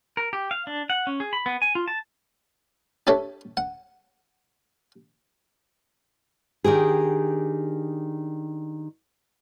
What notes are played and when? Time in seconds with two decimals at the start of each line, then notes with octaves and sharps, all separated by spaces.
0.17 A#4
0.33 G4
0.51 F5
0.67 D4
0.90 F#5
1.07 C#4
1.20 G#4
1.33 B5
1.46 B3
1.62 G#5
1.75 F4
1.88 A5
3.07 D4 G4 A4 C#5 E5
3.57 F#5
6.64 D#3 D4 G4 G#4